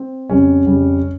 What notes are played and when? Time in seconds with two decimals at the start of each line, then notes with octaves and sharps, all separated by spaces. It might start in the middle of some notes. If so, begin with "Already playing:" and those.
Already playing: C4
0.30 F2 C#3 G3 C#4
0.66 F2 C#3 G3